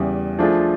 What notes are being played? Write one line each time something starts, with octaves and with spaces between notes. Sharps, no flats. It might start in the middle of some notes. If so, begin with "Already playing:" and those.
Already playing: E2 C#3 E3 G3
F3 A3 D4 F4 G#4